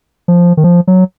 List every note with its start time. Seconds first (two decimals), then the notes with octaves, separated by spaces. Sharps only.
0.28 F3
0.57 D#3
0.64 F3
0.87 F#3